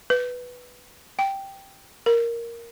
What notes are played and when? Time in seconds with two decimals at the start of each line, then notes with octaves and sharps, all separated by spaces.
0.10 B4
1.19 G5
2.06 A#4